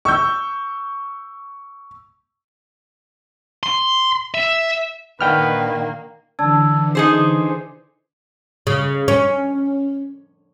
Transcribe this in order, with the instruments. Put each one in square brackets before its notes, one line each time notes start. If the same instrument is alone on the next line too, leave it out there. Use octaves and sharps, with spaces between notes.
[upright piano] C#6 E6 G6
[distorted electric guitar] C6
E5
[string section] A#2 D#3 D4 [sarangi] A#3 [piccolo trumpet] B4 [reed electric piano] F#5 G5 F6
[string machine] D3 E3 [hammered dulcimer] D4 [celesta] A5 E6 G#6
[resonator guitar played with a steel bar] D#4 G#4 C5 [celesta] D6
[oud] C#3
C#4